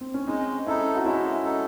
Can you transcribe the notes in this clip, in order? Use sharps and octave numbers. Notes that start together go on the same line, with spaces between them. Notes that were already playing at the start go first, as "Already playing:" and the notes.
C4
C#4
G#3 C4 D#4
C#4 D#4 E4 A4
F#4
G#3 C#4 E4
D#4 A4